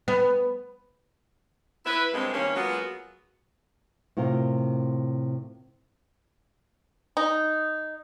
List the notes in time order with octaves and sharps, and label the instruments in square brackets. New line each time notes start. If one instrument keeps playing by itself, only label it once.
[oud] B3
[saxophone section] E4 B4
G2 C#3 G#3 A#3 C4
G2 D#3 A#3 C#4
F#3 G#3 A#3 B3 F4 F#4
[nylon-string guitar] A2 C3 F4 A#4
[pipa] D#4